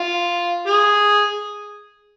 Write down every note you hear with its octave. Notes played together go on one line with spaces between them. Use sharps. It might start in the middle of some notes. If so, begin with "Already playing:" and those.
Already playing: F4
G#4